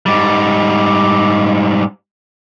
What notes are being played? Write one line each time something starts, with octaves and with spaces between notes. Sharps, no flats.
G#2 G3